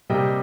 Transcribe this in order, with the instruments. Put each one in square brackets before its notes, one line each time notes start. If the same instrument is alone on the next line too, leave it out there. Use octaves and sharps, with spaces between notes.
[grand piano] C3 G3 A#3 D#5 G5